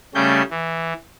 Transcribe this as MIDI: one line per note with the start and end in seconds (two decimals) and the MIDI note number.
0.15 0.42 49
0.15 0.42 55
0.15 0.42 57
0.15 0.42 61
0.15 0.42 91
0.50 0.93 52